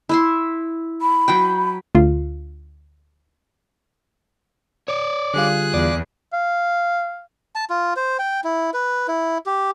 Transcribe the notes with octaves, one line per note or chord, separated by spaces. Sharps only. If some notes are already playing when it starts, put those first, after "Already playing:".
E4 E5 C6
B5
F#3 B4 G5
D2 F4
C#5 D5
D3 G3 F4 G#4 F#6
E2 D5
F5
A5
F4
C5
G5
E4
B4
E4
G4